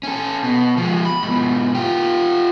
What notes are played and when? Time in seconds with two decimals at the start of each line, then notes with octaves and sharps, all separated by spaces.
0.03 C#4 A4
0.43 B2
0.77 F3 G#3
1.05 B5
1.23 G#2 B2
1.75 F4 G4